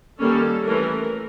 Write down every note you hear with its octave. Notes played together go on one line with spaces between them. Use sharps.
D#3 G3 A#3 C#4 A4
E3 A3 C#4 A#4